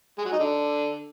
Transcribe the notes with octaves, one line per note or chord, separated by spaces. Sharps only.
G#3
F#3
D#4
D3